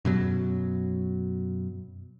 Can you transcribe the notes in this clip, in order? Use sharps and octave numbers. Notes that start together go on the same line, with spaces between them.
F#2 B2 F#3